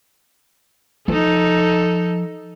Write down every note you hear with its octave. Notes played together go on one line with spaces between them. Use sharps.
F3 D#4 A4